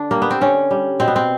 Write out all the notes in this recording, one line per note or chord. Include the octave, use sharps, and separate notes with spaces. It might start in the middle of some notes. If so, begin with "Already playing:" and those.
Already playing: D3 D4
G3 A#3
B3
C4
D3 C#4
G3
B2 C4
B3
C4